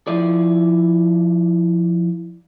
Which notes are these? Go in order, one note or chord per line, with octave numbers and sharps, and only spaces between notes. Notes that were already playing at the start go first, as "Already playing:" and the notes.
F3 E4 D5